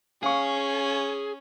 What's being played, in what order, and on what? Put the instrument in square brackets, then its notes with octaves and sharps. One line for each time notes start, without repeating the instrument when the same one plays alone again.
[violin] C#4 [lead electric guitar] G#4 [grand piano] F5 C#6